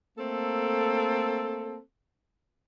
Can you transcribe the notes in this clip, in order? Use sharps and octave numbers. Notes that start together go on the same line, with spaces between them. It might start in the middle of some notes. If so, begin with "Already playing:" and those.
A3 A#3 C4 A4